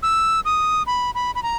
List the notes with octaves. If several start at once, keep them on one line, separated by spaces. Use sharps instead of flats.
E6
D#6
B5
B5
B5
A#5